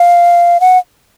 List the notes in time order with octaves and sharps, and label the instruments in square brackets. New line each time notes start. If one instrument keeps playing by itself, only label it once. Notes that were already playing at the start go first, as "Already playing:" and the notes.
Already playing: [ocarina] F5
F#5